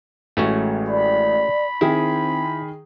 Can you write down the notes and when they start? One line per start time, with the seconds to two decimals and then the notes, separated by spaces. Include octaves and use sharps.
0.37 A1 G#3 A3 C#4 F#4
0.88 D5 B5
1.81 D#3 C4 E4 G#4 G5